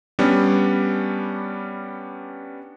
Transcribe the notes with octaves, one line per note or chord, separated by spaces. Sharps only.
G3 B3 C#4 D4